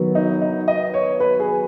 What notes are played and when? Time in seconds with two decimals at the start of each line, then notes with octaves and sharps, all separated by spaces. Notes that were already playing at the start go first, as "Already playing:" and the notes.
Already playing: D#3 F#3 B3
0.15 D#4
0.42 D#4
0.68 D#5
0.94 C#5
1.20 B4
1.40 G#4